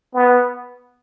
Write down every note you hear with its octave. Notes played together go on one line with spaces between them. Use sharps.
B3